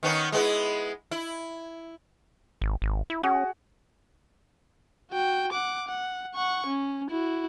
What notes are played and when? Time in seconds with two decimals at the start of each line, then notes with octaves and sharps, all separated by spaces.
0.03 D#3 B3 C#4
0.32 G#3 B3 E4
1.11 E4
2.62 G#1
2.82 G#1
3.10 E4
3.23 C#4 F#4 G#4
5.11 F#4 G5
5.52 F#5 D6
5.88 F#5
6.35 F#5 C#6
6.66 C#4
7.10 E4 F#4